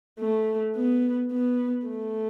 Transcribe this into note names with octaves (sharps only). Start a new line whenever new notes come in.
A3
B3
B3
A3